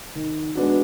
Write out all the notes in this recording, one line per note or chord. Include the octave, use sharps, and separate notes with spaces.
D#3
G#3 B3 D4 F#4